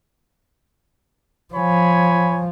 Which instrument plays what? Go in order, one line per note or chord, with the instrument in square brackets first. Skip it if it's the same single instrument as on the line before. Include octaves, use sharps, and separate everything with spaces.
[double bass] F3 [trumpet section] C#5 G#5 B5